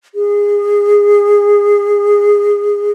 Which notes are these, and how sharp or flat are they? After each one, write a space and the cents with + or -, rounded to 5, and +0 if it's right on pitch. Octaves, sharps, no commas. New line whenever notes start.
G#4 -20